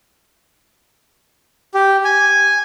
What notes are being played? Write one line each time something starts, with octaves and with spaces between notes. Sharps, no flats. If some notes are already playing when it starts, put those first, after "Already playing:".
G4
G#5